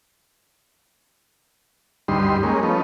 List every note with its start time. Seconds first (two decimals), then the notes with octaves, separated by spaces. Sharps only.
2.08 D2 G2 G3 D#4 C6
2.43 G3 G#3 A#3 C#4 D#4
2.63 F3 A3 B3 C#4 D#4